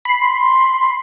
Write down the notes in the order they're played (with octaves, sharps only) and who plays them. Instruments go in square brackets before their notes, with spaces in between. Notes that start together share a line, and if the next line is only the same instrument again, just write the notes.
[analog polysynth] B5 C7
[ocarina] C6